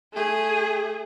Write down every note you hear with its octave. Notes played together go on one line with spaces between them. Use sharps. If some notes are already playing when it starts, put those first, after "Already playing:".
A3 G#4